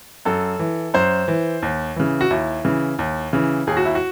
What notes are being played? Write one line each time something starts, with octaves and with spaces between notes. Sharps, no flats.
F#2 A4
E3
F#2 C5
E3
D#2
C#3 E3
F#4
D#2 E4
C#3 E3
D#2
C#3 E3
D#2 G#4
F#4
E4
F#4